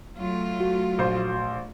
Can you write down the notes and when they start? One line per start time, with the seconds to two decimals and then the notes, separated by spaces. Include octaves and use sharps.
0.15 F#3 A3 F4
0.60 F#4
0.98 A#1 C5 C6